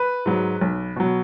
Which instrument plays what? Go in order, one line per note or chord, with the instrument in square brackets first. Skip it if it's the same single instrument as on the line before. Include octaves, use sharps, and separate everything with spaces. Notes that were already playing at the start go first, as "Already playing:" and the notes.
Already playing: [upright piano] B4
G#2 F#3
B1
B2 F#3